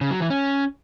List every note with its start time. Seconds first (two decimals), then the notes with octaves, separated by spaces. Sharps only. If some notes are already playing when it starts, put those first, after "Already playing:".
0.01 C#3
0.11 F#3
0.20 E3
0.30 C#4